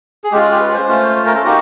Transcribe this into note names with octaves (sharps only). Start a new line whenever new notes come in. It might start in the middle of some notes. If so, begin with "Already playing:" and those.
G#4
G#3 C#4 F4 G4
G#4
G4
B4
C5
A3 C#4 F4
C5
A#4
A4
A#3 D#4 F#4 G4